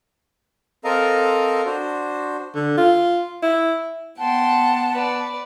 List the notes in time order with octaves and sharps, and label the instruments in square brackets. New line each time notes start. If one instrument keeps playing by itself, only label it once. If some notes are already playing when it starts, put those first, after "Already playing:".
[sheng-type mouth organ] C4 A4 A#4 D#5 F5 A#5
D4 F#4 C5
[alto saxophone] D3
F4
E4
[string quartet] B3 F#5 [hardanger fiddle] G5 C6 [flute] A5
[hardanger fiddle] B4 D5